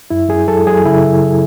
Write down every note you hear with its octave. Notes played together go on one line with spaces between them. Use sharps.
F#2 E4
F#2 G#4
F#3 A4
F#3 G#4
C#3 E4